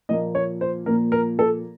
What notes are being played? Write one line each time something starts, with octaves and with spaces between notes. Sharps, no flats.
A#2 F3 A#3 D#5
C#5
C5
A#2 F3 A#3 A#4
A#4
A4